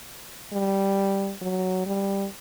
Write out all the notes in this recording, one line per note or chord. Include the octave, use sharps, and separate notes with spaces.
G3
F#3
G3